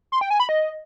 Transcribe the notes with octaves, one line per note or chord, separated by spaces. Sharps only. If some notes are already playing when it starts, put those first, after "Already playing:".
C6
G5
G#5
B5
D#5